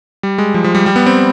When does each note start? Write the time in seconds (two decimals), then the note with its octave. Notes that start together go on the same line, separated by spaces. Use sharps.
0.23 G3
0.38 G#3
0.54 F3
0.64 F3
0.75 G3
0.86 G3
0.96 B3
1.06 C4